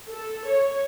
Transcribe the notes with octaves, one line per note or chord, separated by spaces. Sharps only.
A4
C#5